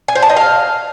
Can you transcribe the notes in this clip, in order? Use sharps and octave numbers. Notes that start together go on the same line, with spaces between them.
G#5
C5
A5
D#5
F5